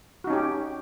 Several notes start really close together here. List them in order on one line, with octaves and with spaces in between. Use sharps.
F#4 D#4 C#4 G4